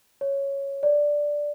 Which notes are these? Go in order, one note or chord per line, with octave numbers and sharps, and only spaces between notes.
C#5
D5